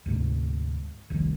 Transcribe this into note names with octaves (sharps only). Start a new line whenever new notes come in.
D2 G#2 C3
F1 C2 F2 D#3